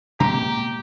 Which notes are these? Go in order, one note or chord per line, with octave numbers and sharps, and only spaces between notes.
B2 G#3 A#3 G4 A#5